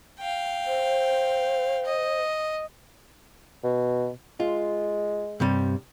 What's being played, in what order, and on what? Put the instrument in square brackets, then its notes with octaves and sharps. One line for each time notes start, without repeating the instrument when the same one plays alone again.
[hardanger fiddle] F5 G5
[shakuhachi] C5
[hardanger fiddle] D#5
[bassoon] B2
[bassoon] G#3 [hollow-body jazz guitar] F4
[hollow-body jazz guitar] G2 C3 G3